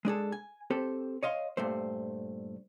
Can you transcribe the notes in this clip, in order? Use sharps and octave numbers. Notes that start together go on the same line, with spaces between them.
G#3 D4 G#4 A4
G#5
C4 G4 A4 C5
C#5 D#5 F5 C6
G2 A#2 A3 C5